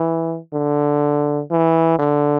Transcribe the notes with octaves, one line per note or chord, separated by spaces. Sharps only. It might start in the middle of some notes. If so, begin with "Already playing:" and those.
Already playing: E3
D3
E3
D3